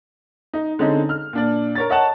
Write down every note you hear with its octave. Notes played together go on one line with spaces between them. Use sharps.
D#4
D3 G#3 C4 C#4 D#4
F6
A#2 D4 D5
A#4 C#5 A6
C#5 D#5 F#5 A5